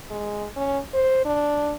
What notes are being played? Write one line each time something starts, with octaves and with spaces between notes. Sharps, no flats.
G#3
C#4
C5
D4